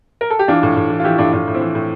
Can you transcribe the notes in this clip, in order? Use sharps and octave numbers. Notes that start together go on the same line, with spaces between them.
A#4
A4
G4
E3 D4 F4
A2
A2
E3
F4
E3 E4 G4
A2 D4 F4
A2 D4 F4
A2
C4 E4
E3
A2